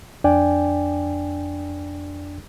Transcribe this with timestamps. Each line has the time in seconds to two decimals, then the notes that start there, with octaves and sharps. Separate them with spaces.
0.24 F2 D4 D5 G5 G#5